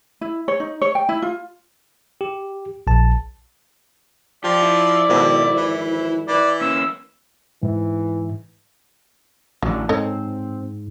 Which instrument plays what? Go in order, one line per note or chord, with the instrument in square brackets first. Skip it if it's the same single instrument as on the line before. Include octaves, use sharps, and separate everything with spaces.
[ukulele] E4
C#5
D#4
C#5
G5
E4
F4
[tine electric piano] G4
A#1 A5
[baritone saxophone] F3 [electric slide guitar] G4 [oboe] D5
[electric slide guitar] E4
[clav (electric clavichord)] G#1 F2 D4 [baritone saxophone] B2
[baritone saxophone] E3
[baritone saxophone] E3 [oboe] D5
[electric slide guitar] A#3 C#4 [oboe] E6
[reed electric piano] G#2 [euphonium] E3
[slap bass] A1 D3 [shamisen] F#3
[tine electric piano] G#2 [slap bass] C4 [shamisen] A4 C#5 D#5